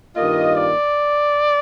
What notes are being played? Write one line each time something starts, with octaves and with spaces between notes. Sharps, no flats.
G2 D#3 A#3 F4 D#5
D5